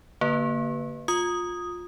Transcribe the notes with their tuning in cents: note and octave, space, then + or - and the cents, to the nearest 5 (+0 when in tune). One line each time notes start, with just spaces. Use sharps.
D3 -20 A#3 +0 B4 +0
F4 +20 D#6 +0